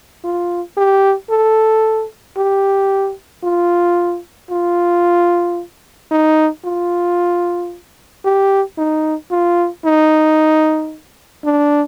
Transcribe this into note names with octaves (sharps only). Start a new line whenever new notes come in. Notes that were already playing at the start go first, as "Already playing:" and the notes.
F4
G4
A4
G4
F4
F4
D#4
F4
G4
D#4
F4
D#4
D4